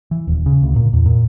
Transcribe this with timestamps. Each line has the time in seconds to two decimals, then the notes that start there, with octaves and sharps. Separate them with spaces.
0.11 E3
0.28 D#1
0.46 C#3
0.63 D2
0.76 A#2
0.93 E2
1.06 A#2